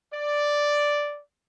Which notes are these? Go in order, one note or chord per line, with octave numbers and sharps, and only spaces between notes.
D5